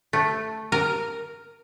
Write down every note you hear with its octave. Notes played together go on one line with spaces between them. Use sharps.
A3
A#4